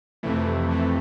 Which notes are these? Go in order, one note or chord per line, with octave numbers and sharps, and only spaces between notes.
F2 C3 E3 A3
F2 C3 E3 A3